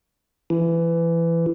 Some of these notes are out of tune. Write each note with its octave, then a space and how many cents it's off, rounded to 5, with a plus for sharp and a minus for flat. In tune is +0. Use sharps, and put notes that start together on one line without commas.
E3 +20